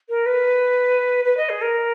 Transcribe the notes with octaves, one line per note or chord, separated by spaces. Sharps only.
A#4
B4
B4
D#5
G#4
A#4